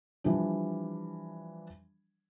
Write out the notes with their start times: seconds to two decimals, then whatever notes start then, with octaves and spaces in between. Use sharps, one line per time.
0.24 E3 F3 G3 D4